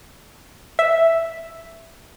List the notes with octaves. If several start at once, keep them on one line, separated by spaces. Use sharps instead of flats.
E5